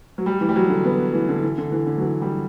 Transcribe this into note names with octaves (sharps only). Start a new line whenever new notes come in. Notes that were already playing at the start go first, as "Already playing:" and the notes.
F#3
G3
E3
G3
F#3
D3
B3
E3
D3
E3
D3
E3
D3
F#3
E3
G3